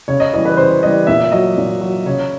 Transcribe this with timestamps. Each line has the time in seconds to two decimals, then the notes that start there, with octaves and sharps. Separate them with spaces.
0.08 C#3 C#5
0.20 D#5
0.34 E3 G3 D#5
0.45 B4
0.57 C#3 C5
0.82 E3 G3 D#5
1.07 A#2 E5
1.32 F#3 D#5
1.58 A#2
1.81 F#3
2.06 C#3 C#5